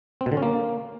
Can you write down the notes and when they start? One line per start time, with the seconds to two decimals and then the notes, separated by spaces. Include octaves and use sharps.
0.21 C4
0.26 B2
0.32 D3
0.37 C#4
0.43 A#3